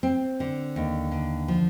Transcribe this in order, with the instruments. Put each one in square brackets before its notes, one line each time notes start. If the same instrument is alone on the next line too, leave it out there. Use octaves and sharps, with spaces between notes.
[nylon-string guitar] C4
D3
D#2
D3
F3